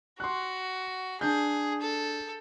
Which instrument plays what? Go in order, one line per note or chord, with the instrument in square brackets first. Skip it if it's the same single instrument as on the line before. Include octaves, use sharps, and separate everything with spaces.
[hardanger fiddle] F#4 [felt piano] C6 F#6
[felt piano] D4 G6 [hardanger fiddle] G#4
[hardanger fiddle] A4